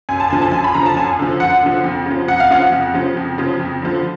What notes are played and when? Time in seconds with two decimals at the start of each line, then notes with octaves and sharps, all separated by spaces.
0.09 F#2 G#5
0.20 A5
0.30 D3 F3 G#5
0.42 A5
0.52 F#2 G#5
0.64 B5
0.74 D3 F3 A#5
0.86 A5
0.96 F#2 G#5
1.19 D3 F3
1.40 F#2 F#5
1.63 D3 F3
1.84 F2
2.06 C#3 F3
2.28 F2 F#5
2.40 F5
2.50 C#3 F3 F#5
2.72 F2
2.94 C#3 F3
3.17 F2
3.38 C#3 F3
3.60 F2
3.82 D3 F3